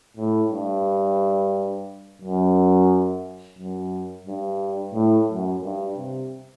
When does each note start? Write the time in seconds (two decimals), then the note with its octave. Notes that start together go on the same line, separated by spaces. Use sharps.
0.17 A2
0.51 G2
2.22 F#2
3.58 F#2
4.27 G2
4.95 A2
5.30 F#2
5.64 G2
5.97 C3